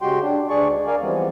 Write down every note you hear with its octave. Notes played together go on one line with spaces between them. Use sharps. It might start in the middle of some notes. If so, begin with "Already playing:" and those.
C#3 G#3 F#4 G4 G5 C6
D4
D2 D4 G#4 D5 C#6
G#3
A#4 D5 F5 G#5
E3 F3 G3 G#3 B3 C4